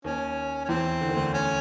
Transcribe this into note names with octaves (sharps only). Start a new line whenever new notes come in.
D#2 D#3 C#4
C#4
E2 E3 C4
D3
D#3
D2 D3
C#4